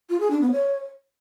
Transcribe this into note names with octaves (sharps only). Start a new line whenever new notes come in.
F4
G#4
D4
B3
C#5